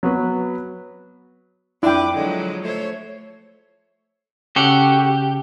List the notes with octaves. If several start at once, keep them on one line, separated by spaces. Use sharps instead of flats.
F#3 B3 B4
F2 D4 E4 B4 G5 D6
D3 F3 F#3 G#3
A3 C5 C#5
C#3 F#4 G4 A4 F#5